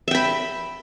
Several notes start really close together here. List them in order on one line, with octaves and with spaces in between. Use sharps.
E5 G5 B5